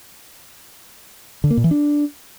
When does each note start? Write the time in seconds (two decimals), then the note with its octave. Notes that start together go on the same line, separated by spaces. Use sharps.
1.44 D3
1.51 A#3
1.57 A#2
1.64 E3
1.71 D4